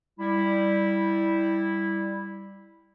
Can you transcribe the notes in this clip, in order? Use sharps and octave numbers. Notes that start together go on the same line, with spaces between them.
G3 E4